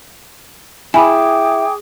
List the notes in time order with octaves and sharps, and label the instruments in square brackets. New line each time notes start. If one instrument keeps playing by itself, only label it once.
[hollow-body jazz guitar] E4 [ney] G#4 [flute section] G5 D6 [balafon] G#5 B5